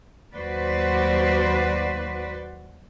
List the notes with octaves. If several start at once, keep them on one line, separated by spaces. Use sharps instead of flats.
D#2 F#3 F#4 B4 C5 D5